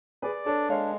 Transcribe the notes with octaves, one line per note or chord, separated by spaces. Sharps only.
G#4 B4 D5
D4 A4 C#5
G#3 C#5 F5